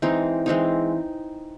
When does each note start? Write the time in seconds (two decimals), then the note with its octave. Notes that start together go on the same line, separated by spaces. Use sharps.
0.02 E3 G#3 C4 D#4
0.46 E3 G#3 C4 D#4